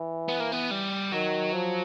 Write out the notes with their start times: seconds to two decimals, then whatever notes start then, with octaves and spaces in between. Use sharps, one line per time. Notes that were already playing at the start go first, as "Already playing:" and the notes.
Already playing: E3
0.28 B3
0.40 A#3
0.52 B3
0.71 G3
1.12 D#3 F#3
1.53 F3